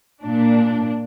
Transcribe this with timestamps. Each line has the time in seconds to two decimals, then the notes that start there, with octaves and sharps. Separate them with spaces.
0.24 A#2 D4